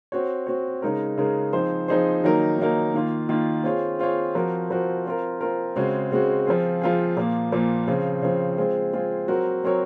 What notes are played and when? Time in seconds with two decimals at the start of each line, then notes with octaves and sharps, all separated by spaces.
0.12 C4 F#4 C#5
0.47 C4 F#4 C#5
0.82 C#3 G#3 D#4 A#4
1.17 C#3 G#3 D#4 A#4
1.53 F3 C4 D#4 G#4 C5
1.88 F3 C4 D#4 G#4 C5
2.24 D#3 F#3 A#3 D#4 A#4
2.59 D#3 F#3 A#3 D#4 A#4
2.94 D#3 A#3 F4
3.29 D#3 A#3 F4
3.64 C4 F4 G#4 C#5
3.99 C4 F4 G#4 C#5
4.35 F3 C4 F#4 A#4
4.70 F3 C4 F#4 A#4
5.06 C4 F4 A#4
5.41 C4 F4 A#4
5.76 C#3 G#3 C4 F#4
6.12 C#3 G#3 C4 F#4
6.47 F3 C4 F4 G#4
6.81 F3 C4 F4 G#4
7.17 A#2 F3 A#3
7.52 A#2 F3 A#3
7.87 C#3 F3 C4
8.22 C#3 F3 C4
8.58 G#3 C4 F4 G#4
8.93 G#3 C4 F4 G#4
9.28 F#3 C4 F#4 A#4 C#5
9.63 F#3 C4 F#4 A#4 C#5